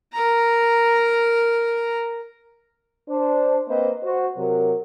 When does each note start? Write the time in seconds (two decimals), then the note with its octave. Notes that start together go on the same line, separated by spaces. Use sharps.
0.13 A#4 A#5
3.09 D4 C5
3.68 A#3 C4 B4 C5 D#5
4.03 F#4 C5
4.37 C3 F#3 A#4